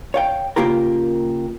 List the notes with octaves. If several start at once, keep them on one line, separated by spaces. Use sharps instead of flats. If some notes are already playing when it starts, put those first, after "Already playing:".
C#5 F5 G5
C#3 A#3 F4 G4 A#4